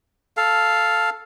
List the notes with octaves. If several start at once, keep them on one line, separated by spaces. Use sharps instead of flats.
A4 F5